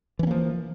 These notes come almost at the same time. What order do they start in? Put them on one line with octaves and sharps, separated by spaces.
E3 C#4 A#3 F3